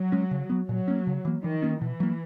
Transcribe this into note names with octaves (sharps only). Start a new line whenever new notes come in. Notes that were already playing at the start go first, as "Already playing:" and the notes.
Already playing: F#3
G#3 C#4
C#3
F#3 B3
A#2 F#3
A#3 C#4
C#3
E3 A#3
D#3 E3
A#3 C#4
B2 E3
F#3 A#3